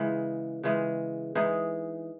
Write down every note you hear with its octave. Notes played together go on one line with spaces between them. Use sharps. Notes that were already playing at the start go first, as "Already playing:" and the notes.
Already playing: C#3 E3 G#3
C#3 E3 G#3
E3 G#3 D#4 G#4